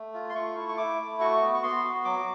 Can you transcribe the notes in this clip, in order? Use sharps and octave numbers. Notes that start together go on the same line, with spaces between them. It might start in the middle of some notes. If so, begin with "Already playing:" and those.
Already playing: A3
F4
C6
A3 C#6
E4
C#6
E4 D6
A3
F#4 C#6
B3
C#6
B3 C6
F#4
F#3 D6